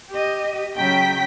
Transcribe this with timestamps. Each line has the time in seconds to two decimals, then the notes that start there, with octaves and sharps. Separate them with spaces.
0.11 G4 D#5
0.77 C#3 F#3 G5 B6